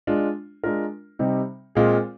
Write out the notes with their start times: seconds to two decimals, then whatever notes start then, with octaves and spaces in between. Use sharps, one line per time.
0.07 G#3 D4 F4
0.63 G#3 D4 F4 A#4
1.19 C3 G3 C4 D#4
1.75 A#2 G#3 C4 F4 G#4